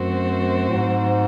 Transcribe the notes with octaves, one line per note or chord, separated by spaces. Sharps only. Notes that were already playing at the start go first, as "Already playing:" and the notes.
Already playing: F#2 F#3 A3 C4 F#4 C5
A2
G#2